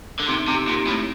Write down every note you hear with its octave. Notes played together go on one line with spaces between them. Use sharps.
D3
C3 D#4
C3
G4
A#2
C4
A2